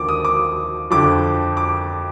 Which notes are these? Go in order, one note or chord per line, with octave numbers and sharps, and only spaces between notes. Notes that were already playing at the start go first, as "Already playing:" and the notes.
Already playing: D#2 D3 F3 D6
D#6
D6
F2 D3 F3 D6
D6